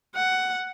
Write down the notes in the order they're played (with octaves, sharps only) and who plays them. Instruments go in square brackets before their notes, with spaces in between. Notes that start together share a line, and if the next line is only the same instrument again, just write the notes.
[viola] F#5